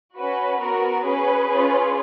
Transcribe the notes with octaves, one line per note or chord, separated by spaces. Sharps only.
C#4 F#4 B4
B3 F#4 A#4
C#4 G#4 B4
C#4 F4 G#4